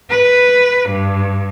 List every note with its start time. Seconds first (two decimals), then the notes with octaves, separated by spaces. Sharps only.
0.10 B4
0.90 G2